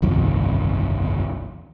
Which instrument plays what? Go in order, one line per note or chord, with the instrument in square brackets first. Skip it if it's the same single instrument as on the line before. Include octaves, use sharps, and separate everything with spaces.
[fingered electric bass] G1 C2 F2 D#3